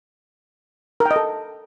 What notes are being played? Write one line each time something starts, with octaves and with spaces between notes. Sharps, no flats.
A#4
G5
D#5
A4